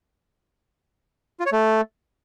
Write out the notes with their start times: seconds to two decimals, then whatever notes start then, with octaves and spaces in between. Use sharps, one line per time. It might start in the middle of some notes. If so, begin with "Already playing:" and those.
1.40 F4
1.46 C#5
1.52 A3